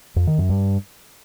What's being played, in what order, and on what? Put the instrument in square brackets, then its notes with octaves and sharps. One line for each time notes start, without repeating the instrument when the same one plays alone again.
[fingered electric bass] F2
D#3
F#2
G2